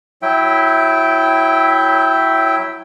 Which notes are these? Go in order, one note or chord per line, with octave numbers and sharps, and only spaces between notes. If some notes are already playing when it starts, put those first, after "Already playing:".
F#3 E4 E5 G5